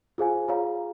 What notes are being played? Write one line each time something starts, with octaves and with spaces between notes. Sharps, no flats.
F4 G#4 C5 F5 G#5
F4 G#4 C#5 F5 A#5